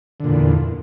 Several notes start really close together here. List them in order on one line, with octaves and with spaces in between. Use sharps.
D3 A#2 E2